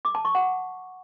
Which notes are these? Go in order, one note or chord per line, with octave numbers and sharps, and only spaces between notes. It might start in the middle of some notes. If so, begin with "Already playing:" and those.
D6
A5
C#6
F#5